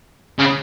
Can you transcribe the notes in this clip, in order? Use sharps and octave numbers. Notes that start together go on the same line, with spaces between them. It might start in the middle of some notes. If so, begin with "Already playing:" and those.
C#3